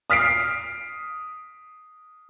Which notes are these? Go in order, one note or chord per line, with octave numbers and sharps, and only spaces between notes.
D#6 F6 B6 C7 D7